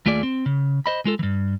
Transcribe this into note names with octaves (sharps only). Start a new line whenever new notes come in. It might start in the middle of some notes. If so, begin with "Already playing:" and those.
D#2 A3 F4 G#4 D5
C4
C#3
C5 D#5 B5
G#3 F4 A4
G2 E3